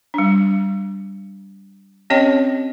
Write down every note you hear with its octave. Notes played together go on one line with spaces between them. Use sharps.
G3 D4
C4 C#4 G4 C#5 D#5 G5